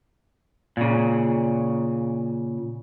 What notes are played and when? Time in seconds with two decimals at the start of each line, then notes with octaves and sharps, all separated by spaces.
0.77 A#2 C#3